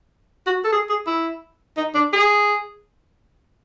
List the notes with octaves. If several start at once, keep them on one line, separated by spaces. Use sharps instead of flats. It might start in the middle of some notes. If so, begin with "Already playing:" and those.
F#4
A4
G#4
G#4
E4
D#4
D4
G#4